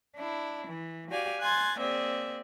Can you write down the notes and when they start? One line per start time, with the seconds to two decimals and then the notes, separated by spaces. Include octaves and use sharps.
0.15 D4 E4
0.67 E3
1.10 F#4 G4 D5 F5 G#5
1.41 G#5 C6 F#6 G#6 A6
1.78 A#3 C4 G#4 D5 E5